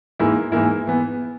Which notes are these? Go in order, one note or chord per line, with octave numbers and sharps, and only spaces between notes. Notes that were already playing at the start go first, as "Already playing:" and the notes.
G#2 E3 A#3 E4
G#2 E3 A#3 E4
E3 B3